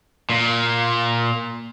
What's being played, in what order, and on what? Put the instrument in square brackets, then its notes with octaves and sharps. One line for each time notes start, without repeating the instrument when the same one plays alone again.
[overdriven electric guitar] A#2